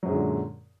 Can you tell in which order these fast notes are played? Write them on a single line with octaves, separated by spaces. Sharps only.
F#3 F#2 G#3 D3 A#2